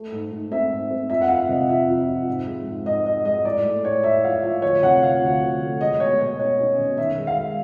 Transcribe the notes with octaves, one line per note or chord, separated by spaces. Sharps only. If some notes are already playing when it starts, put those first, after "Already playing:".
Already playing: A3
G#2
G#2
C4 E5
G#2
C4
F2 E5
F#5
F2 F5
C3 D#5
F2 E5
F2
F2
G#2
G#3
G#2
G#2 D#5
G#2 D#5
G#3 D#5
A2 D5
A3
A2 C#5
A2 E5
F3 F5
F3 E5
D2 C#5
C3 F#5
F3 F5
D2
D2
A3
G#3 D#5
B2 C#5
B2 C#5
C#4 C#5
C#4
B2
D#3 E5
G#3
F5
G#3